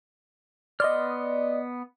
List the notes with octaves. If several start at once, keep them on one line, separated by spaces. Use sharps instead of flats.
B3 D5 D#5 C6 F6